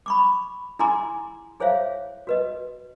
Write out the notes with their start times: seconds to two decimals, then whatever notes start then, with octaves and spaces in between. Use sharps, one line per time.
0.06 B5 C#6 D6
0.79 E4 G#4 G#5 A#5 C6 D6
1.60 E4 G#4 C5 C#5 E5 F5
2.27 F#4 B4 D#5